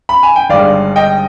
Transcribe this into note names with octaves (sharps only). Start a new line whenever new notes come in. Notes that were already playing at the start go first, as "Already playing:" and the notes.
B5
G#5
G5
G1 G2 D#3 G#3 D5 F5
D#5 G5